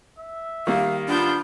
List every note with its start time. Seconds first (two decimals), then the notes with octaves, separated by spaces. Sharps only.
0.18 E5
0.67 D#3 G3 A#3 F5
1.09 B3 D4 F4 G6